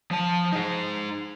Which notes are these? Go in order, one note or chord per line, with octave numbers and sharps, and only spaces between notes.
F3 A5
D#4 G#4